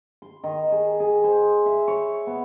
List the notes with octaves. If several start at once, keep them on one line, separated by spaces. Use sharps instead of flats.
C6
D#3
G#4
G#4
C5
E5
C#5
B3